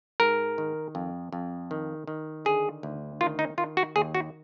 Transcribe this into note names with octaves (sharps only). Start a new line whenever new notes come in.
G#2 A#4
D#3
F2
F2
D#3
D#3
D3 G#4
D2
D#3 F4
D#4
D#3 F4
F#4
D#2 G#4
F#4